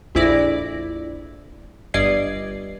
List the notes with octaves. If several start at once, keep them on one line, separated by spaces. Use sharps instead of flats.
A#1 F2 E4 D5 A#6
G1 G2 D5 D#5 G#6 C7